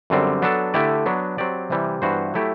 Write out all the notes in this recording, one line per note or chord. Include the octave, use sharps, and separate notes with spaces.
F#2 D3 G3 C4
F#3 B3 D4 A4
D3 A3 E4 G4 D5
F#3 B3 D4
F#3 C4 G4 D5
C3 E3 G3
G2 E3 B3 F#4 C5
F#3 A3 E4 G4